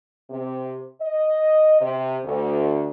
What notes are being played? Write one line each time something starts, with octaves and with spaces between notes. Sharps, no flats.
C3
D#5
C3
D2